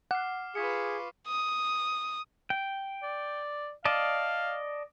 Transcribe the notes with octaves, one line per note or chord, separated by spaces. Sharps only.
F#5 D6 F6 C7
F4 G#4 B4 C#6 B6 C#7
D#6
G5
D5
D5 D#5 F5 A5